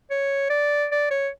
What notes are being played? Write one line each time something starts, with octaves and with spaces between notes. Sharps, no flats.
C#5
D5
D5
C#5